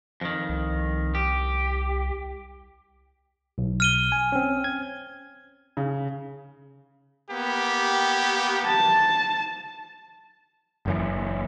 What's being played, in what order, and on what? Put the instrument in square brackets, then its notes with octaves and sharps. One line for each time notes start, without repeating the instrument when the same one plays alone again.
[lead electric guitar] F2 D#3
[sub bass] C2
[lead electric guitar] G4
[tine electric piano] B1
[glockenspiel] F6 D#7 G7
[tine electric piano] G#5
C4 C#4
G#6
[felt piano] C#3
[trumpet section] A#3 B3 G4
[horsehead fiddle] A5
[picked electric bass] F#1 F#2 E3